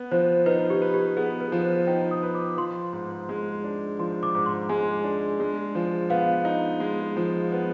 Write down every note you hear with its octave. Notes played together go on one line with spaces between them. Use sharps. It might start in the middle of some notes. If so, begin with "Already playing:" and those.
Already playing: B3
F3 C5
D#4 B4
G4
B4
G4
B3 G#4
B4
F3
C5
D#4 G5
D#6
B4
D6
F3 C6
G#2
G#3
D4
F3 C6
D6
G#2
C6
G#3 G#5
D4
G#3
F3
B3 F5
D#4
G#3
F3
B3